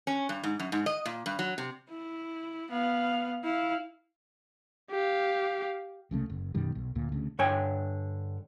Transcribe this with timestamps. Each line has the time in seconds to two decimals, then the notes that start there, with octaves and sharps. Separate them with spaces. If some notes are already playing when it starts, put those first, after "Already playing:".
0.07 C#4
0.29 G2
0.44 G#2
0.59 F#2
0.72 G#2
0.86 D#5
1.06 A#2
1.26 G2
1.39 F#3
1.58 C3
1.89 E4
2.71 B3 F5
3.44 E4 F5
4.91 G4 F5
6.11 C2 C#3 F3 A3
6.30 F#1
6.54 F#2 B2 D#3 G3
6.75 B1
6.95 D2 A#2
7.12 D2 C#3
7.39 G2 D3 C#5 G5 G#5